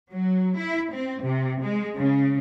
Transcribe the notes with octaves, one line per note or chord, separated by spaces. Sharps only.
F#3
E4
C4
C3
G#3
C#3